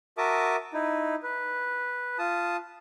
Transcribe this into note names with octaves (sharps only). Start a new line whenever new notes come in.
F#4 A#4 E5 A5 D6 D#6
D#4 E4
B4
F4 A5 D#6